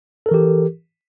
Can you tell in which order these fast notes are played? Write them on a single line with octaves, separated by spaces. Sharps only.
A4 A#4 E3 G4